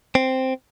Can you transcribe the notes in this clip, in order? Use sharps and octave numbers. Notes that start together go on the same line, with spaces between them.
C4